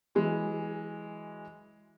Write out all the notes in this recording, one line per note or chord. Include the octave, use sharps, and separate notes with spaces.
E3 F#3 G#3